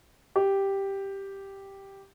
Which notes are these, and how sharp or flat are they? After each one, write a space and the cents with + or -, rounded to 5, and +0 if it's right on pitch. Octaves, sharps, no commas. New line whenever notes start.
G4 +0